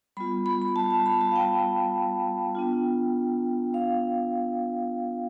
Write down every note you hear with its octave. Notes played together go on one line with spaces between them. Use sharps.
G3 B3 F4 B5
B5
B5
A5
A5
B5
A5
F5
G5
B3 D4 F4
F5